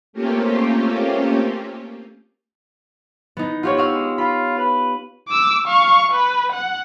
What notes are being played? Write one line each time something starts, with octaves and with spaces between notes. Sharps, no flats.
A3 A#3 C4 C#4 F4 G4
B3 D#4
F4 G4 C#5 F#5
F5 C#6 E6
G#3
F4 B5
B4
D6 E6
F5 C#6
B4
F#5